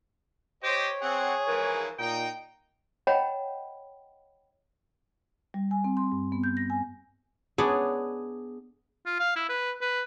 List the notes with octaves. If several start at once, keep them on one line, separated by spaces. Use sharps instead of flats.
G4 C5 C#5 D#5
C4 G#4 F#5
G#2 E3 F3 A#4
A#2 D#4 G5
C#5 D#5 F#5 G5 A#5 B5
G3
G#5
C4
C6
G2
B3
G6
A#6
G#5
B3 D4 G#4 C#5
F4
F5
E4
B4
B4